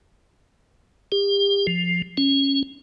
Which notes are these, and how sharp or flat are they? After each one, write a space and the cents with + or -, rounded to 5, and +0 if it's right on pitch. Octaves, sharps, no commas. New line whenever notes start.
G4 +35
F3 +10
C#4 -10